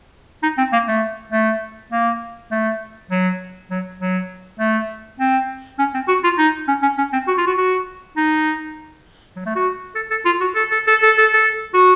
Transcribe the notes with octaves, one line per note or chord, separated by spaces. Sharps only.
D#4
C4
A#3
A3
A3
A#3
A3
F#3
F#3
F#3
A3
C4
C#4
C4
F#4
F4
D#4
C#4
C#4
C#4
C4
F#4
F4
F#4
F#4
D#4
F#3
A3
F#4
A4
A4
F4
F#4
A4
A4
A4
A4
A4
A4
F#4